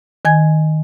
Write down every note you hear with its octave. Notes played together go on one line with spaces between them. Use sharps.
D#3 G#5 G#6